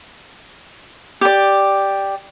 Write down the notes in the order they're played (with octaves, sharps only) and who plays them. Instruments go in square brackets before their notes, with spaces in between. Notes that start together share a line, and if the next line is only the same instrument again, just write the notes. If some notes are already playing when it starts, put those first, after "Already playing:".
[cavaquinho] G4 D5